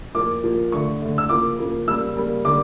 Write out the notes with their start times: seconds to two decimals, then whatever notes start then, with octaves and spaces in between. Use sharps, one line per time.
0.15 A#2 F3 A#3 D6
0.44 A#2 F3 A#3
0.72 D3 A3 C#6
1.01 D3 A3
1.18 E6
1.29 C#3 F3 A#3 D6
1.59 C#3 F3 A#3
1.88 C#3 G3 A#3 E6
2.17 C#3 G3 A#3
2.45 D3 G3 A#3 D6